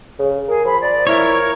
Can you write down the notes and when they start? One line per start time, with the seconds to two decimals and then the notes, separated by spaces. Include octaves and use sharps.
0.19 C#3
0.48 G#4 A#4
0.65 F3 B5
0.81 D5
1.07 F3 E4 A#4 C#5